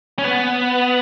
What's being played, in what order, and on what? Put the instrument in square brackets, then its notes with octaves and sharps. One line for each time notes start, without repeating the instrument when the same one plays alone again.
[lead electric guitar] C#4
[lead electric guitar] B3 [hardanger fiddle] F#5